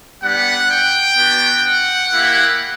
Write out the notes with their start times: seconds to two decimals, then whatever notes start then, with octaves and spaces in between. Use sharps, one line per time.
0.23 G3 B3 D4 G4 F#5
0.70 G5
1.16 B3 D4 F#4
1.63 F#5
2.10 A#3 E4 G4